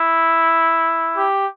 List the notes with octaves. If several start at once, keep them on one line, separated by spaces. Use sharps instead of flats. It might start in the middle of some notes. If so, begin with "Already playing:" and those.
Already playing: E4
G4